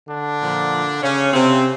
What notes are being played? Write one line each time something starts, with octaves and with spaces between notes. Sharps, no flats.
D3 D4
A#2 F3
C#3 C#4
C3 C4